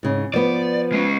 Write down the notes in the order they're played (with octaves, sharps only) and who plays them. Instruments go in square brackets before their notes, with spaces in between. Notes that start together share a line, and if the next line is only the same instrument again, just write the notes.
[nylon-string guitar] G#2 C#3
[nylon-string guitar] F3 B3 [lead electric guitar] D5
[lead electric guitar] G#3 C#4